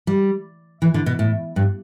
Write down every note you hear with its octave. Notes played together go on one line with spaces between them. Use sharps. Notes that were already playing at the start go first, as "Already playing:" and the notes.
G3
E3
D3
B2
A2
G2